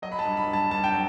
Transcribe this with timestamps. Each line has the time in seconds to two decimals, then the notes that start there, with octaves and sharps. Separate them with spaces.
0.02 F#3 D#5
0.12 B5
0.19 A5
0.25 G2
0.37 B5
0.48 G2
0.53 A5
0.70 G2 A5
0.84 G5
0.93 F#3